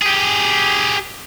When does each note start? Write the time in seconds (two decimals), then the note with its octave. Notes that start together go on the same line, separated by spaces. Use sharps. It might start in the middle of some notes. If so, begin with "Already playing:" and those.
0.02 G4 G#4